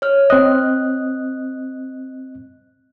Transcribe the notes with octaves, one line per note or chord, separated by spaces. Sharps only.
C#5 F6
C4 D#5 F#6